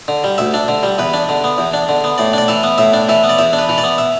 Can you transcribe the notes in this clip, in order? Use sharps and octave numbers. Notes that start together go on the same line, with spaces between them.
D3
G3
D2 E5
D4
D3
G3
E2 B4
D4
D3
B3
E2
D4
D3
B3
A2 D5
D4 D5
E3 E5
B3
A2 E5
D4
E3 E5
B3
D5
E2 E5
D4
B4
E3
D5
B3
E5